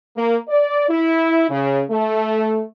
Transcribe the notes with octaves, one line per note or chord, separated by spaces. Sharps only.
A#3
D5
E4
C#3
A3